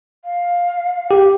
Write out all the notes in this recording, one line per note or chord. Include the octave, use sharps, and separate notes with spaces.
F5
G4